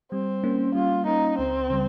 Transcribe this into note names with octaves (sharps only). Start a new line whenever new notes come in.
G3 C4
A#3 C#4
G3 F4
A#3 C#4 D#4
C#2 C4
C#3 G3